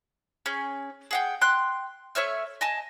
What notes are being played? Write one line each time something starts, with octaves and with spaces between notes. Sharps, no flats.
C#4 G#4
G#4 F#5 G5
G5 C6 F#6
A3 C#5 E5 F6
D#5 G#5 A5